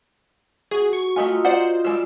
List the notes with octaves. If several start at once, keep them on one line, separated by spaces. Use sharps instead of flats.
F#4 G#4
C#6
A3 F4 G4 A#4 D#5 G#5
C5 D5 F#5
G3 G#3 F4 D5 E6